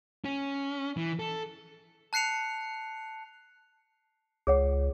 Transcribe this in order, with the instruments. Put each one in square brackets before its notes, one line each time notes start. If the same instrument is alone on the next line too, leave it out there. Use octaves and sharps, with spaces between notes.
[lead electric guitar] C#4
E3
A4
[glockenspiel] A5 F#6 C7 C#7 F7
[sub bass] C#2 [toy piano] G#4 C#5 F#5